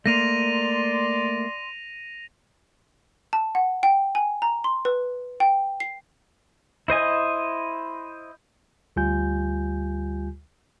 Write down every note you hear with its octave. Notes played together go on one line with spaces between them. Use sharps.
A3 A#3 A#4 D5 C6 A#6 D#7 F7
A5
F#5
G5
G#5
A#5
C6
B4
G5
C7
E4 C5 D#5 G#5
D2 G3 F4 G4 G#5 G6